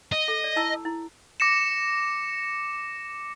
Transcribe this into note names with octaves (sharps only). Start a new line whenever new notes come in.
D#5
A4
D5
E4 A5 E6
E4
D6 A#6 C#7 E7